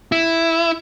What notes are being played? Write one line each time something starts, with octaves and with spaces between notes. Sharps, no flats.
E4